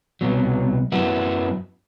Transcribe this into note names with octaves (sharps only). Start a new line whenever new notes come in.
C2 B2 F#3
F#2 F#3 B3 E4